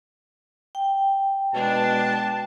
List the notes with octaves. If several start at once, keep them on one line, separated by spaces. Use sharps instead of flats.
G5
B2 G#3 D4 A5